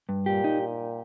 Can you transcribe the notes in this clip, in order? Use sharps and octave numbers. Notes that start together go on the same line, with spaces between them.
G2
A#2 G4
D#4